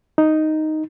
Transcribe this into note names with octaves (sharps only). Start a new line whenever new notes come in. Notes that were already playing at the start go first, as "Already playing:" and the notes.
D#4